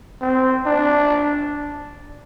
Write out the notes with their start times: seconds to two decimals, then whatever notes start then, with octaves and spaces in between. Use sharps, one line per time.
0.21 C4
0.66 D4